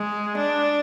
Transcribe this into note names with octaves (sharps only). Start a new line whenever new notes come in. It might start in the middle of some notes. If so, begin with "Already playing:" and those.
Already playing: G#3
D4